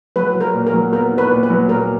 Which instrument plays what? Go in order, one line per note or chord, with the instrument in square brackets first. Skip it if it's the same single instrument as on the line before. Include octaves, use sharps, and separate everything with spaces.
[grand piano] F#3 [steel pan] B4
[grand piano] F#3
[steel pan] A#4
[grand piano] A#2
[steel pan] A#4
[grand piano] F#3
[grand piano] B3 [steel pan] A#4
[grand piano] D#4
[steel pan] B4
[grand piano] A#2
[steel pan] B4
[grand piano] F#3
[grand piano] A#2 [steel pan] A#4